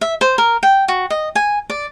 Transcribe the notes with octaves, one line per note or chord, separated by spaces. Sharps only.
E5
C5
A#4
G5
F#4
D#5
G#5
D5